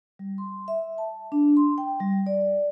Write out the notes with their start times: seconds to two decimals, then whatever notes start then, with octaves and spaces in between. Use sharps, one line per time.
0.19 G3
0.38 C6
0.68 E5
0.98 A5
1.32 D4
1.57 C6
1.78 G5
2.00 G3
2.27 D5